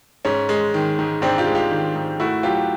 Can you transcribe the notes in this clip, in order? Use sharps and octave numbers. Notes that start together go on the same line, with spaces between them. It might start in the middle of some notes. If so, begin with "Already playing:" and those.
G#2 C#4
G#3
D#3
G#2
G#2 C4 D4
F4 G4
G#3
F4 G4
D#3
G#2
A3 E4 F#4
F#3 F4 G4